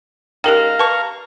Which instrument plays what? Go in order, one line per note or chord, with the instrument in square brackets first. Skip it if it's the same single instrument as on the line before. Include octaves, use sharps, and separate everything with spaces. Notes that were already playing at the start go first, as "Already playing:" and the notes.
[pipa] G#3 C#4 D#4 [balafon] G4 A#4 G5 [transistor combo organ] F5 A#5
[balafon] B4 [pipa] A5 C#6